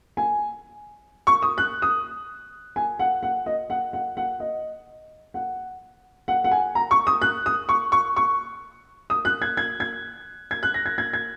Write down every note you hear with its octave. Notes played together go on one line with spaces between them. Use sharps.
G#5
C#6
D#6
F#6
D#6
G#5
F#5
F#5
D#5
F#5
F#5
F#5
D#5
F#5
F#5
F#5
G#5
A#5
C#6
D#6
F#6
D#6
C#6
C#6
C#6
D#6
F#6
G#6
G#6
G#6
G#6
F#6
A#6
G#6
G#6
G#6